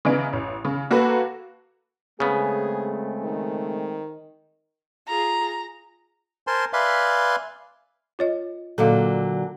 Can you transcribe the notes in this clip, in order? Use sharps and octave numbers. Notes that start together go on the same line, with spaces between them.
C#3 E3 B3 D#4 D7
A1
C#3
A#3 F#4 A4 B4
C#3 G#3 A3 B3 C4 G#4
D#3
F4 G#4 A#5
A#4 C5 G#5 A5 C6
B4 D5 E5 F5 G#5 C6
F4 C#5 D#5
A#2 D3 F#3 A4 D#5 F5